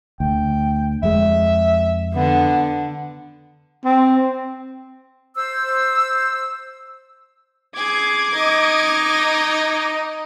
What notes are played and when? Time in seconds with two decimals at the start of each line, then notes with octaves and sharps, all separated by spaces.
0.20 D2 G5
1.03 F2 G#3 E5
2.14 D3 B3
3.85 C4
5.37 C5 E6
7.76 G#4 D6 G#6
8.34 D#4 D#5